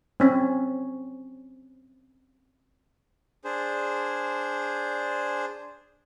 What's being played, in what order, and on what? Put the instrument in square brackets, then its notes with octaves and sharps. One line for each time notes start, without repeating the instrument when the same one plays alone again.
[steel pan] C4 C#4
[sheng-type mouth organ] D4 G#4 C5